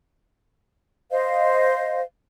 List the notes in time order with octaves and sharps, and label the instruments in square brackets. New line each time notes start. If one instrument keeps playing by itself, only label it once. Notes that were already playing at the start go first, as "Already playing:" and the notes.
[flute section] C5 D#5 F5